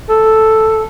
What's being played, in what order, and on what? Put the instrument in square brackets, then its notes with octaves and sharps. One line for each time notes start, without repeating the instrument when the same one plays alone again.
[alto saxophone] A4